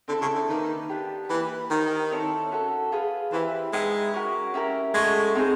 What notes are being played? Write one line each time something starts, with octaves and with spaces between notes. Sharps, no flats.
D3 C4 E4 A4
C#3
D3
D#3 A#3 D#4 F#4 B4
B3 D4 G4
E3 A#3 D#4 G4 B4
D#3 G4 C5 E5 G5
C4 E4 A4 C#5
C#4 F#4 A4
F4 G#4 B4
E3 E4 G4 C5
G#3 D#4 G4 B4 E5
C#4 F#4 A#4
C#4 E4 G4 A#4
G#3 A3 C#4 F#4
C4 D#4 G#4